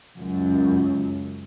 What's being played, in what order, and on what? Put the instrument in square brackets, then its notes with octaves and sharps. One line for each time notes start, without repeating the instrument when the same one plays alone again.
[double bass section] C#2 F#2